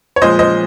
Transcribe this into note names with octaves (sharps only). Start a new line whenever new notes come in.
C#5
A#2 F3 G#3 C5 D#5
C5 D#5